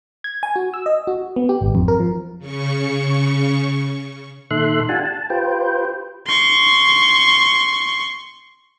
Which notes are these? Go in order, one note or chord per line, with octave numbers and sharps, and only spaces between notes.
G#6
G#5
F#4
E6
D#5
F#4
B3
G4
G#1
F2
A#4
F3
C#3 C#6
A#2 D#3 A4 E5 C6 F#6
D4 F4 G4 F#5 G#5 A5
A5
F4 G4 B4 C5 G5
C6 C#6